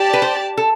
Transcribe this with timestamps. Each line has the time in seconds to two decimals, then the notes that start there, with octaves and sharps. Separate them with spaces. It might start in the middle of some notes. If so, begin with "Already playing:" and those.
Already playing: G4 D5 A5
0.13 B4
0.22 C5
0.57 A4